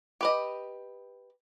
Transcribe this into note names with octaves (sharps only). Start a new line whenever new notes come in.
G4 B4 D#5